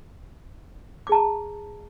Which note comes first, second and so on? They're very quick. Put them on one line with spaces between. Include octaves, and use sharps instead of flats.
D6 G#4 A5 A#5